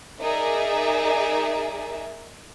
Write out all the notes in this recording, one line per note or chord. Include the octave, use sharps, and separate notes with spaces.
D#4 G#4 A#4 D5 E5